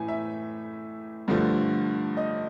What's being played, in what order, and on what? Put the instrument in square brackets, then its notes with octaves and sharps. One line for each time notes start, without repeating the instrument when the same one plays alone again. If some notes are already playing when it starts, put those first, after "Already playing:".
Already playing: [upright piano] A2 E3 A3 G#5
E5
G2 D3 F3 A3
D#5